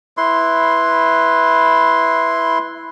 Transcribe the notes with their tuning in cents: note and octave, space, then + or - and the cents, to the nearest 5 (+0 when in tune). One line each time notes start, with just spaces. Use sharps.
E4 +0 B4 +0 C6 +0